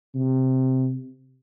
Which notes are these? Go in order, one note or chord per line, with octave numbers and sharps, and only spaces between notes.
C3